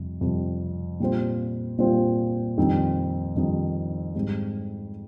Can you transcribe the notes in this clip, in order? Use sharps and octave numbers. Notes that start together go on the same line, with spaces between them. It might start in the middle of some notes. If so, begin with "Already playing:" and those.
Already playing: F2 C3 G3
F2 C3 G3
A#2 G3 C4 F4 C5
A#2 G3 C4 F4 C5
F2 D#3 G3 C4 D#4
F2 D#3 G3 C4 D#4
G#2 G3 C4